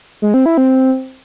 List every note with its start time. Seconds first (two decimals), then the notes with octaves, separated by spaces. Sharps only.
0.22 G#3
0.34 C4
0.46 E4
0.58 C4